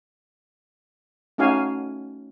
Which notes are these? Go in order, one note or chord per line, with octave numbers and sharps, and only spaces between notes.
A3 C#4 D#4 F#4 F5 G#5